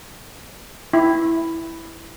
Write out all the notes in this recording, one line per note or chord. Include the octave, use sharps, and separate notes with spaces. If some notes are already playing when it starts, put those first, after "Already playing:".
E4